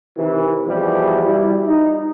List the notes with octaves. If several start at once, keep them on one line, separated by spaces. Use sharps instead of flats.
C3 D#3 E3
E2 B2 F3 G3
G3 E4
D#4